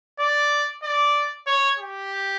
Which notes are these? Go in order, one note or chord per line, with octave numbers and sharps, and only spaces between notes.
D5
D5
C#5
G4